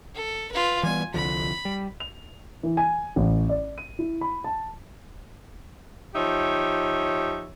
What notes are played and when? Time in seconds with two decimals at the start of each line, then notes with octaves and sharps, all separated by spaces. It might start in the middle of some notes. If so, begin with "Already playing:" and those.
0.15 A4
0.52 F4 B4
0.83 E3 G3 B3 G#5
1.14 C2 D3 F3 B5
1.65 G3
2.00 F7
2.63 E3
2.77 G#5
3.16 A1
3.49 D5
3.78 D#7
3.99 E4
4.21 B5
4.44 A5
6.14 F3 D#4 G4 C#5 E5